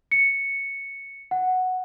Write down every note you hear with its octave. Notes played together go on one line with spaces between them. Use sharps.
C#7
F#5